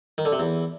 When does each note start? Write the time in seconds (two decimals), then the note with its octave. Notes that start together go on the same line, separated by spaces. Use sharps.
0.18 D#3
0.25 D3
0.33 C3
0.40 E2